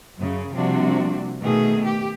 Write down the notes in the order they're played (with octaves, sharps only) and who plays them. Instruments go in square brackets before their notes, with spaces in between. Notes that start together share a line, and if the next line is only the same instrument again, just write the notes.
[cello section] F#2 C#3
C3 F3 G3 A#3 D4 F#4
B2 D#3 A3 G#4
G4